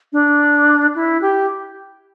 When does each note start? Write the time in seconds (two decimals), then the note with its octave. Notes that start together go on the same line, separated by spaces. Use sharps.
0.13 D4
0.95 E4
1.22 G4